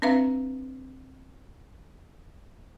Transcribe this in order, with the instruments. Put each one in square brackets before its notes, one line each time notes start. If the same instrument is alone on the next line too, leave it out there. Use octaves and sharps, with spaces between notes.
[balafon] C4 D4 B4 E5 F5 A#5